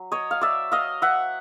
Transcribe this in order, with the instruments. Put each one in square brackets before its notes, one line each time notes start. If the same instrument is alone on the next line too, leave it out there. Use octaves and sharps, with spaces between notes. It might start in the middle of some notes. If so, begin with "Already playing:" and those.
Already playing: [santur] F#3
C#5 D#5
F5
D5 E5
D#5 F5
E5 F#5